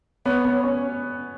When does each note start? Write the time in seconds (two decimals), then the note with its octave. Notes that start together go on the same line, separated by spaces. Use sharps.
0.25 B3 C#5
0.45 B3
0.63 C#4